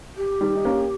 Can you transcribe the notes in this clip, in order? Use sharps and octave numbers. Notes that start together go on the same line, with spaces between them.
G4
D#3 G3
D#4
A#3 C#4